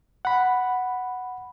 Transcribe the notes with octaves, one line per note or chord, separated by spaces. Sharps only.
F#5 B5